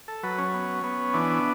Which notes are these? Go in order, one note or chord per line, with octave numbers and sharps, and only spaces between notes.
A4
F#3 B4
C#4
B3
B3
E3 D4